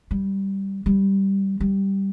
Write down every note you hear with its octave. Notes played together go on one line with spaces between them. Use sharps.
G3
G3
G3